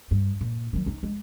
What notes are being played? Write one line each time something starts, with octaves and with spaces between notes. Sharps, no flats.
G2
A#2
D#3 F#3
C#4 D#4
G#3